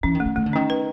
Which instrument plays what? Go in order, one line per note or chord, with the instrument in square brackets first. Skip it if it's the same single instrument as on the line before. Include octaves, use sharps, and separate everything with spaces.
[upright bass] E3 [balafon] C#4
[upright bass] D#3
[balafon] A3
[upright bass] D#3
[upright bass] D#3 [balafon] A3
[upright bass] D3
[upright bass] D#3 [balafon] C#4
[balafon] B4